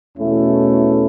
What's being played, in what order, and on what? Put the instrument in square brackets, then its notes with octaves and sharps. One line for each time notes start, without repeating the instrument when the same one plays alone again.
[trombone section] E2 B2 A3 C#4 E4